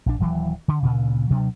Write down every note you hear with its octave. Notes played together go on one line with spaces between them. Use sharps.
A#1 D4
D#1 E3 F#3
D3
D2 A#2 C#3
D2 B2 F#3 D4